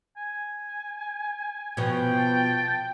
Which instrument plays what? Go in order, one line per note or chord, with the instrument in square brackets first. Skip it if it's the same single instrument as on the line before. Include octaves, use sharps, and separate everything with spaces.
[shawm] G#5
[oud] B2 F3 [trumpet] G5
[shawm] A5